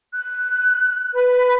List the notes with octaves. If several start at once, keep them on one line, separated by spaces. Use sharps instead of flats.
F#6
B4